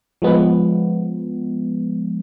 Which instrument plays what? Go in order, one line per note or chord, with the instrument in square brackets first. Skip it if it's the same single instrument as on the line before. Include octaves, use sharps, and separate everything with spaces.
[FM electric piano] F3 G#3 B3